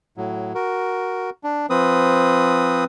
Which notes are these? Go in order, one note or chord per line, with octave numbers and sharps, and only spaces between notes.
A2 F#3
F#4 A#4
D4
F3 C4 B4 D#6